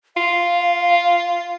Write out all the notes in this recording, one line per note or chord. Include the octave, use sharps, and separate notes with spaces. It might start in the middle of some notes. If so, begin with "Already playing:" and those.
F4 F5